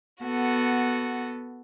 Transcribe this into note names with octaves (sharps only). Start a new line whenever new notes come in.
B3 F#4 A4